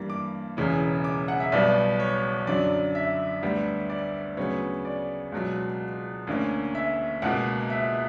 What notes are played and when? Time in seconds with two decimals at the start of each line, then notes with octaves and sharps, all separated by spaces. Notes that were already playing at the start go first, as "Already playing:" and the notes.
Already playing: G2 E3 G3 A#3
0.10 D6
0.57 E1 E2 C#3 E3
1.04 D6
1.28 F#5
1.40 E5
1.52 B1 B2 G3 B3 D5
2.00 C#5
2.47 F#2 D3 F#3 D5
2.95 E5
3.43 D2 D3 G3 B3
3.90 D5
4.37 D2 C#3 F#3 B3 C#5
4.85 D5
5.32 C#2 B2 F#3
6.27 D2 D3 A#3 C#4
6.75 E5
7.22 C#2 B2 A#3 F#5
7.70 E5